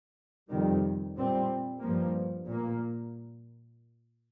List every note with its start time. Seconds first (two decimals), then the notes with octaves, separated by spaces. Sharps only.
0.50 F2 C3 D#3 G3
1.17 A#2 G3 C4
1.82 G2 F3 A#3
2.48 A#2 A#3